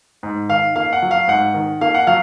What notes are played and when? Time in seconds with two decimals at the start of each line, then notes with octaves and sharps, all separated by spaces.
0.23 G#2
0.49 D#3 F5
0.76 A#3 F5
0.93 F#5
1.02 F#3
1.11 F5
1.28 G#2 F#5
1.54 D#3
1.81 A#3 F5
1.95 F#5
2.07 F#3 F5